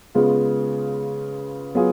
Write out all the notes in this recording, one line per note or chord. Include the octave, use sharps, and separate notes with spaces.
C#3 G#3 B3 F4
F#3 B3 F4 G#4